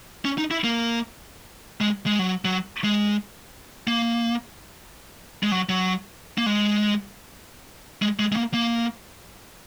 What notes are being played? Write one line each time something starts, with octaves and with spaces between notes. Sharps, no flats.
C#4
D#4
E4
A#3
G#3
G#3
F#3
F#3
G#3
A#3
G#3
F#3
F#3
A#3
G#3
G#3
G#3
G#3
A#3
A#3